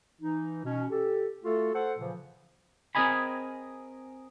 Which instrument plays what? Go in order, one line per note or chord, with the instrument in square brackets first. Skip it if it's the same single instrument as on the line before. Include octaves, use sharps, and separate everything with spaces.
[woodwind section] E3 D#4
B2 C#4
G4 A4
A3 F4 F#4 A4
A4 C5 F#5
A#2 C#3 E3 F3
[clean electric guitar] C4 G#4 A#4 D#5 G#5 B5